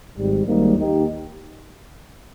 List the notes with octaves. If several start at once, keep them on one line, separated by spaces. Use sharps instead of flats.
G#1 G#2 G3
G#1 G#2 G3 A#3 D#4
D#2 D#3 A#3 D#4 G4